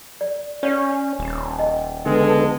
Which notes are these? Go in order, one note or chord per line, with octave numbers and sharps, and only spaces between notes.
D5
C#4 C#5 D5 F#5
D#1
D#5
D3 G#3 B3 A4